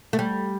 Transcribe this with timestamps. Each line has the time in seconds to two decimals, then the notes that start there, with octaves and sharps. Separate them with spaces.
0.13 A3
0.19 G3